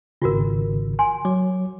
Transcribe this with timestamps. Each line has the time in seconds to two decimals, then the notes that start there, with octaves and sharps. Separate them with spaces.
0.22 G#1 C#3 F4 F#4 A#4
0.99 G#5 C6
1.25 F#3 D6